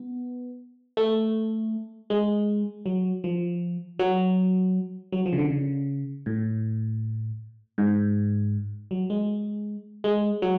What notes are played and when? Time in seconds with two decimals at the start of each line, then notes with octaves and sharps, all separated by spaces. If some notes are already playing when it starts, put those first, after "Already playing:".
Already playing: B3
0.97 A3
2.10 G#3
2.86 F#3
3.24 F3
3.99 F#3
5.12 F#3
5.26 F3
5.33 C#3
5.38 D3
5.51 C#3
6.26 A2
7.78 G#2
8.91 F#3
9.10 G#3
10.04 G#3
10.42 F#3